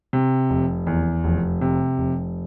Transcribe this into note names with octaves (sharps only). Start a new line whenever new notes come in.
C3
F1
E2
F1
C3
F1